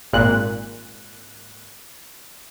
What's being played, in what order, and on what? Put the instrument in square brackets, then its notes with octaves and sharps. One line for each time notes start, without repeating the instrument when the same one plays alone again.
[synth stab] G#1 A#2 F#6